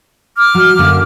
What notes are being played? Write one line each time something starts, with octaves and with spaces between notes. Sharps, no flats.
D6 F6
F#3
F#2 D3 A#3